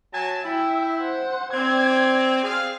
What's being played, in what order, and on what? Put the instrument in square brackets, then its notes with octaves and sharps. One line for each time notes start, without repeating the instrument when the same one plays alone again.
[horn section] F#3 G#5 A5
[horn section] E4 [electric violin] E5 G5
[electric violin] C5 F#5
[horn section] C4 [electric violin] D5 G#6
[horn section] C4 G#4 F5